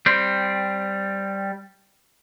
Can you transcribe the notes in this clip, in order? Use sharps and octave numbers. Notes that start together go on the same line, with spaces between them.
G3 C4